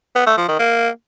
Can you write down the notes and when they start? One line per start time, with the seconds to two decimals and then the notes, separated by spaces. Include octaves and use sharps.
0.16 B3
0.27 A3
0.37 F3
0.48 D#3
0.59 A#3